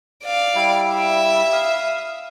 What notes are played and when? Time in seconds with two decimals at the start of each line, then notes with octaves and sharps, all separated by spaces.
0.24 D5 F5
0.55 G3 E4
0.95 E5
1.53 F5 D#6